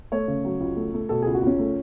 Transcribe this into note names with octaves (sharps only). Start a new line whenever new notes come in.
A3 C#5
C#3
F#3
C#2
A3
A3
B2 A4
C#2 G#4
F#4
C#2 C#4
A3